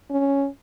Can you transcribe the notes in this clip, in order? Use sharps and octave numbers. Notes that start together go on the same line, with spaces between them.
C#4